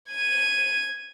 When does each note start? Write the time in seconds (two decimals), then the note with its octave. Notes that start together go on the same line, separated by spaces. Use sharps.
0.11 G#6 D#7